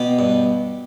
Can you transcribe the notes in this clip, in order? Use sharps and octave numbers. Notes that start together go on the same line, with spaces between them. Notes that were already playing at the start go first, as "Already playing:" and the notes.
Already playing: B2 G4
G2